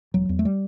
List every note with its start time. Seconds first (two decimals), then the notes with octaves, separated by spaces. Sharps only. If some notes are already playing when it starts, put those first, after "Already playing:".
0.14 E1 F#3
0.29 E2
0.39 A3
0.45 G3